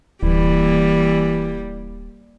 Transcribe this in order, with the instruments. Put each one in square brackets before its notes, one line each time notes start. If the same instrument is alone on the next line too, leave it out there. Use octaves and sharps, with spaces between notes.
[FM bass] D1 [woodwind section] E3 E4 [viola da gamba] G3 A#3